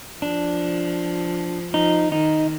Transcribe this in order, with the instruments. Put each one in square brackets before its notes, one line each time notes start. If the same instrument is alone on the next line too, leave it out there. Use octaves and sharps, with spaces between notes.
[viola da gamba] F3 [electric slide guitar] D4
[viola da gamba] F3 [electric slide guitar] D#4
[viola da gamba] D#3 [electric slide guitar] D#4